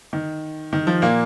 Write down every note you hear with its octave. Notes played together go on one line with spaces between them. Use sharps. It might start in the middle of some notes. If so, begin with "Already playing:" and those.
D#3
D#3
F3
A#2 A#3